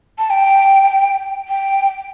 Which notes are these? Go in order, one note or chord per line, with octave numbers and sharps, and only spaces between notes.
A5
G5
G5